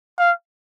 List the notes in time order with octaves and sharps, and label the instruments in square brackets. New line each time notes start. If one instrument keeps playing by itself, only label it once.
[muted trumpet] F5